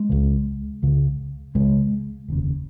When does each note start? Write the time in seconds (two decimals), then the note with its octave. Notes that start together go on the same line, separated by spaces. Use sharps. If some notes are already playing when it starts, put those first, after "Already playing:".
Already playing: G#3
0.09 C#2 C#3
0.82 C#2 C#3
1.55 C#2 C#3 G#3
2.28 F1 D#2 C#3